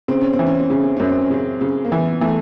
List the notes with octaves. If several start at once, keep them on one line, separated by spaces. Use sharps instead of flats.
C#3 C4
C#4
C4
E3
C#4
C4
C#3 C#4
C4
F#2 C#4
C4
C#4
C#3 C4
C#3
A#3
E3 B3
E3 A3